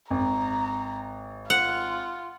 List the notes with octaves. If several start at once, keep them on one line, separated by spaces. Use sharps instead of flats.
G#1 A#5
F4 F#5